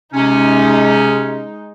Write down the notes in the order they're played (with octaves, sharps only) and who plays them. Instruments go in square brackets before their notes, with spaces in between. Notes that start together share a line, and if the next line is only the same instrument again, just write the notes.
[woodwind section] C3 C#4 [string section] G#3 D#4